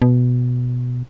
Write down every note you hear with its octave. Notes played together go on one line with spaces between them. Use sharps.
B2